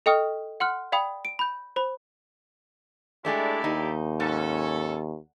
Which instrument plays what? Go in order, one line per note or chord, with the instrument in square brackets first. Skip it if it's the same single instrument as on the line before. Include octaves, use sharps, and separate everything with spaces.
[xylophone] A4 D#5 G5 C#6 D#6 F6
F#5 C6 F6 F#6
D5 F5 G5 B5 D#6
D7
B5 G6
C5 B5
[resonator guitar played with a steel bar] G#3 A3 D4 [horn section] E4 G4 D5
[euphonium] D#2 [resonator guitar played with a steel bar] D#4
[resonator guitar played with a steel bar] G#2 [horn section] C#4 A4